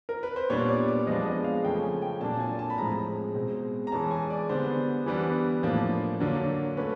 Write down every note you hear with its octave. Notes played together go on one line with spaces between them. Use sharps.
A#4
B4
C5
A#2 G3 B3 D4 C#5
D5
D5
F3 G#3 B3 D4 D#5
D#5
F5
C#3 F3 A3 C#4 G5
G#5
G5
A#2 F#3 A#3 D4 A5
G#5
A5
B5
A2 F3 G#3 C4 A#5
B2 G#3 C4
A#5
E3 G#3 C#4 A5
G#5
D5
D3 G3 B3 D4 C5
E3 G3 B3 D4
A2 F3 A#3 D4
D3 F#3 A#3 D4
A3 C#4 B4